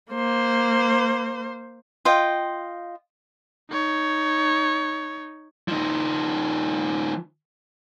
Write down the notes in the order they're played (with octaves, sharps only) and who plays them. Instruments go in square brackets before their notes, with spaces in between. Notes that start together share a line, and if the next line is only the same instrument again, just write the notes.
[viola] A#3 C5
[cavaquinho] F4 D#5 G5
[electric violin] D#4 C#5
[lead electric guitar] F3 D#4